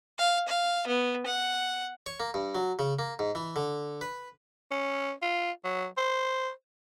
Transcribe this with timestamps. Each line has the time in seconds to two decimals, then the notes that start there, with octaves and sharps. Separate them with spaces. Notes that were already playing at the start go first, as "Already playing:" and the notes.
0.18 F5
0.48 F5
0.87 B3
1.26 F#5
2.06 C#5
2.20 A#3
2.34 G2
2.55 F#3
2.79 C#3
2.99 A#3
3.19 G#2
3.35 E3
3.56 D3
4.01 B4
4.71 C#4
5.22 F4
5.64 F#3
5.98 C5